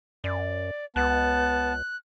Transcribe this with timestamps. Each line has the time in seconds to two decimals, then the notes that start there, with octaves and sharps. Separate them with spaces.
0.24 F#2 D5
0.96 C#2 B3 A5 F#6